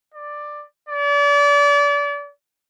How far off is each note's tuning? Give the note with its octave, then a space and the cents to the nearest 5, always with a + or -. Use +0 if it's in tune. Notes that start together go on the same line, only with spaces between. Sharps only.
D5 +10
D5 -35